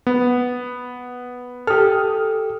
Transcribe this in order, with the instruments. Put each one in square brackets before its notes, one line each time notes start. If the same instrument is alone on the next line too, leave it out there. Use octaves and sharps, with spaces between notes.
[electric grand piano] B3
[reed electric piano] G4 A4 [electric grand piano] D#6 F6